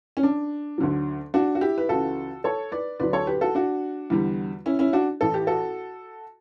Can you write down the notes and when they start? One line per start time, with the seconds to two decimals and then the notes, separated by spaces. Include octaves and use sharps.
0.17 C#4
0.23 D4
0.78 D2 D3 F#3
1.34 D4 F#4
1.55 F#4
1.61 E4 G4
1.78 B4
1.89 C#2 C#3 E3 F#4 A4
2.44 A4 C#5
2.72 B4 D5
3.00 D2 D3 F#3 B4 D5
3.13 A4 C#5
3.27 G4 B4
3.41 F#4 A4
3.55 D4 F#4
4.10 E2 D3 G3
4.66 C#4 E4
4.79 C#4 E4
4.93 D4 F#4
5.21 A1 A2 E3 A4
5.34 G4
5.47 F#4 A4